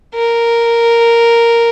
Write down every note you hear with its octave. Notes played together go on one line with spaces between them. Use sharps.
A#4